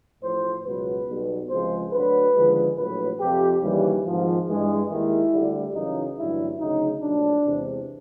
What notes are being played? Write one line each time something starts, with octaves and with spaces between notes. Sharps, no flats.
A1 A2 F3 C5
C#2 B2 F#3 B4
B1 B2 G3
C#2 C3 F3 G#3 C5
D2 D3 F#3 B4
D#2 D3 F3 G#3
A#1 A2 F#3 B4
F2 C3 F3 G4
D#2 C#3 E3 G3
G#1 G#2 F3
G2 E3 G#3
D#2 D#3 G#3 E4
D2 D3 G3
F#2 C#3 E3 D#4
A1 G2 D3 F#3 E4
D2 C#3 F#3 D#4
A#1 A2 F#3 D4
E2 C3 E3 G#3